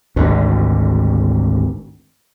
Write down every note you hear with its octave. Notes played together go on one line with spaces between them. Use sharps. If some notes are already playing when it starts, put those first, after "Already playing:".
G#1 D2 B2